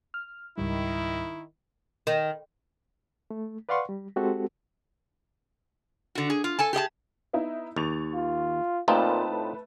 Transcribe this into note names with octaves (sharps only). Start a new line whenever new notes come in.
F6
C#2 G#2 D#3 G3 E4
D#3
A3
B4 D5 F5 F#5 C6 C#6
G3
G#3 C4 F#4 G4 A4
D3 F#4
G#4
F4
A4 G#5 A5
G4 G#4 D#5 A5
B3 D#4 E4
D#2 C#6 A6 F7
F4
A#2 A3 C4 D#4 F4 B4 A5
A2